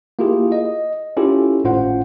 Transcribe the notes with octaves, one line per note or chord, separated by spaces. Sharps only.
A#3 E4 F4 G4 G#4
D#5
C#4 E4 F4 G4 A4
G#1 A2 C#4 F4 C5 F#5